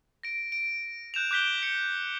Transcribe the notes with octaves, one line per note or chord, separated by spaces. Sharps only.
A#6 D7
D7
F#6 G6 E7 F7
D6 F#6 G6 B6 D7 G7
C#7